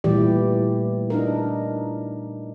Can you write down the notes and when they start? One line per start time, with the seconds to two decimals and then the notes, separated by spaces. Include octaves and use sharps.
0.04 A#2 E3 G3 A3 G4 D5
1.10 D4 D#4 A#4